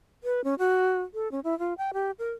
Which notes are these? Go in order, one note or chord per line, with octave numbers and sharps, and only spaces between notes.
B4
C#4
F#4
A4
C#4
E4
F4
G5
G4
A#4